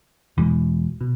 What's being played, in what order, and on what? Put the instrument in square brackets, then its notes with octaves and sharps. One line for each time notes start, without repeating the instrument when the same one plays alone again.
[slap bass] E1 E2 B2 G#3
B2